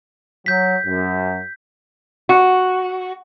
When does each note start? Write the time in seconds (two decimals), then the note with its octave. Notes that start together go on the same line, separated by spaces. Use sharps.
0.46 F#3 G6 B6
0.86 F#2
2.29 F#4